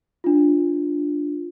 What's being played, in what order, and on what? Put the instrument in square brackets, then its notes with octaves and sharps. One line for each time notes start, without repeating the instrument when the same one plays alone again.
[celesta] D4 F4